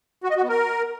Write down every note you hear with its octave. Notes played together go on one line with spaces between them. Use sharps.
F#4
D#5
F#4
B3
A#4